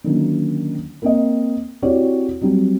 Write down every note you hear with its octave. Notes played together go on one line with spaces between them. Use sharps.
D3 D#3 F#3 A#3 C#4
A#3 C4 D#5
C4 E4 F#4 G4 C#5 D5
F#3 G3 C4 G4